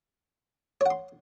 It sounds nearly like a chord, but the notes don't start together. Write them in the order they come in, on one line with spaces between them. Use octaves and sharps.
C#5 F#5 C6